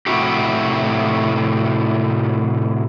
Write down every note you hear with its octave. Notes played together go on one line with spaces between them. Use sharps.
A2 C3 G3 E4 F#4 G4